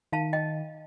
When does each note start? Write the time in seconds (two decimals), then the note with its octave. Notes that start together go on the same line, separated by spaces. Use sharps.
0.12 D#3 F5 A5
0.33 D#5 G5